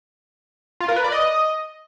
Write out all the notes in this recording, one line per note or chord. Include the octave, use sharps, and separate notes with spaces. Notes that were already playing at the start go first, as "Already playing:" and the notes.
F4
A#4
B4
D5
D#5